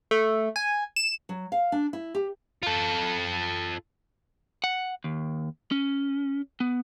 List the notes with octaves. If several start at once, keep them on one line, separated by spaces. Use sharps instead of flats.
A3
G#5
E7
F#3
F5
D4
E4
G4
F4 A4
F#5
D#2
C#4
B3